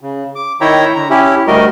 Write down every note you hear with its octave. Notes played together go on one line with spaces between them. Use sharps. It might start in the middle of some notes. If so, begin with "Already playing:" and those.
C#3
D6
D#3 E4 C#5 E5 G5 A#5
D3 A#5
C#4 E4 G4
D2 G3 A3 F#4 A#4 D#5